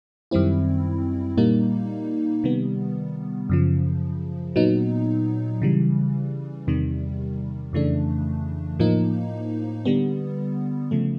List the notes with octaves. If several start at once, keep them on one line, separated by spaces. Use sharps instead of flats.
F#2 D#3 G3 C4 E4
A#2 G3 A#3 D#4
C3 D#3 G3 B3
F#2 C#3 F3
A#2 F#3 B3 D#4
C#3 E3 G3
E2 C3 D#3 G3
F2 C#3 E3 A3 D4
A2 F3 A#3 D#4
D3 G3 B3
C#3 F3 A3